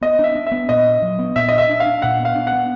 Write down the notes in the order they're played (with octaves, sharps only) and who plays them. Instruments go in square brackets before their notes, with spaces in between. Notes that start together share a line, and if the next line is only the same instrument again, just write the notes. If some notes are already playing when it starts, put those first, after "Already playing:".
[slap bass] B3 [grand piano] D#5
[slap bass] D4 [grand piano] E5
[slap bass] D4
[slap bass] B3 [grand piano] E5
[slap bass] A#2 [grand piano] D#5
[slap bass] D4
F#3
B3
[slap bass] A#2 [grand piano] E5
[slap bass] D4 [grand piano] D#5
[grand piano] E5
[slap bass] D4
[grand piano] F5
[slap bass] D4
[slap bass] A#2 [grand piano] F#5
[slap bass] B3
[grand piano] F5
[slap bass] D4
[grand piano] F#5
[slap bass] B3